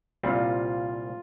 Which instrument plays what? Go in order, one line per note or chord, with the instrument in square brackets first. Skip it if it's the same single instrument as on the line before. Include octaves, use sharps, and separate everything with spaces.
[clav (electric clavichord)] C2 A#2 G3 C4 [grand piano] F4